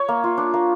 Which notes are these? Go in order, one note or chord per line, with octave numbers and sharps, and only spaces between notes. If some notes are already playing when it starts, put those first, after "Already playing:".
Already playing: C#5
A#3
F4
D4
A#3